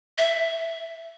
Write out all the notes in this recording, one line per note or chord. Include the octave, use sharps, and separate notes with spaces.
E5